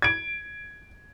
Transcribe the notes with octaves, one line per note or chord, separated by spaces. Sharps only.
G#6 D7